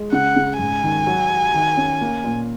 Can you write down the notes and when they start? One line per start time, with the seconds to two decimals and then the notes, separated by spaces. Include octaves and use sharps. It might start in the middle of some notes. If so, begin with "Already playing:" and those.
Already playing: G#3
0.12 C#3 F#5
0.36 C#3
0.59 G#2 G#5
0.83 D#3
1.07 F#3
1.30 F#3
1.54 D#3
1.77 C#4
2.01 A#3
2.24 A#2